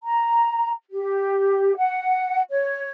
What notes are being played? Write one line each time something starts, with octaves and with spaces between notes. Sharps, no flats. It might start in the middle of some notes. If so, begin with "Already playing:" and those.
A#5
G4
F#5
C#5